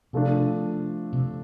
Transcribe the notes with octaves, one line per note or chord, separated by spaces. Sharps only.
C3 F3 A3 D4
C3